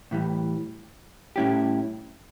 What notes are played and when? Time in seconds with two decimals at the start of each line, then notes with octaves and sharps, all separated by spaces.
0.11 A2 E3 G3
1.36 A2 G3 C#4 E4 G4